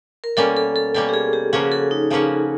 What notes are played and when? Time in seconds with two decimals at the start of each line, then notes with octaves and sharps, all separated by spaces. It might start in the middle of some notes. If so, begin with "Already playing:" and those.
0.24 A#4
0.37 B2 G3 A#3 C#4 A4
0.57 A4
0.76 A4
0.94 B2 G3 A#3 C#4 A4
1.09 G4
1.14 G#4
1.33 G4
1.53 C#3 F3 A#3 C#4 F#4 G#4
1.72 A4
1.91 D#4
2.10 C#3 F3 A#3 C#4 F#4